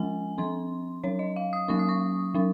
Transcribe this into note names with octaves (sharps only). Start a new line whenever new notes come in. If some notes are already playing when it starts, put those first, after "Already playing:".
Already playing: F3 G#3 C#4 G#5
F3 C4 C6
F#3 C#4 C#5
D#5
F5
D#6
F#3 A#3 C#4 C#6
D#6
C#6
F#3 C#4